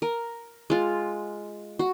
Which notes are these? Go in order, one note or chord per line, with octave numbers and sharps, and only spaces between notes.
A#4
G#3 F4
F#4